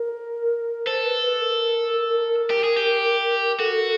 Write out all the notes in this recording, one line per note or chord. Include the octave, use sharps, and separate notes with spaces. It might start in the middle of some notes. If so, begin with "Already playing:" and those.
Already playing: A#4
A4 C5
B4
B4
A#4
G4
G#4
G4
F#4 A4